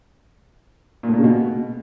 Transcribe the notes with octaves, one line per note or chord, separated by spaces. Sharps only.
A#2
A2
A#2
C#3
B2